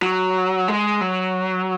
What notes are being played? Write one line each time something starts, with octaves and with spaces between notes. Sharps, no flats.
F#3
G#3
F#3